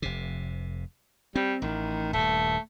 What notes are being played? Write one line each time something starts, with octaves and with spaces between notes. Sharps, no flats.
F1 C3
G3 C4
A1 D#3
D#1 G2 A3